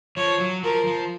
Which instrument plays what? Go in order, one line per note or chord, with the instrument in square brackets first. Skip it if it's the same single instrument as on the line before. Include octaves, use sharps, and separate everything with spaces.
[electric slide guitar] F3 [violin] C#5
[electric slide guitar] F#3
[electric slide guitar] F3 [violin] A#4
[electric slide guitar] F3